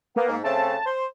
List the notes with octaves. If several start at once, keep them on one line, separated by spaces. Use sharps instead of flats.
A#3 B3
G#2
C#3 A3 C4 A5
C5